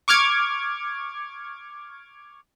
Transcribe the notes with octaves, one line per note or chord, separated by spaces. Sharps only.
C#6 D6 F6 G#6